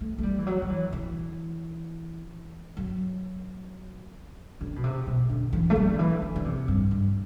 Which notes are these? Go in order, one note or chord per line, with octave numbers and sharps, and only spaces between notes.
A3
A3
G3
E3
F#3
F#3
E3
E3
F#3
D3
B2
C3
B2
D3
E3
A3
G3
D3
E3
D3
D3
C3
G2
G2